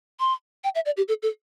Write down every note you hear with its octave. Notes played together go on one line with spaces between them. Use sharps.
C6
G5
E5
D5
G4
A4
A4